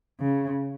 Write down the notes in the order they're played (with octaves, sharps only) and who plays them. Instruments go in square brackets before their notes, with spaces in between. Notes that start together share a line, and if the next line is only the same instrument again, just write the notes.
[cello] C#3